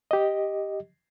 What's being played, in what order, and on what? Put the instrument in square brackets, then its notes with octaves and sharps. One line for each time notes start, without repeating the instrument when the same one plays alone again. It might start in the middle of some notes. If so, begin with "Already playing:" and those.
[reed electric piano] G4 D#5